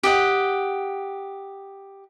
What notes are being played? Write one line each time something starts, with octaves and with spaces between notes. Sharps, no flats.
G4 D#5 F#5